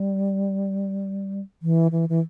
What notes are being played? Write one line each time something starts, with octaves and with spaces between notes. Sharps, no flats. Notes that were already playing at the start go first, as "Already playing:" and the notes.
Already playing: G3
E3
E3
E3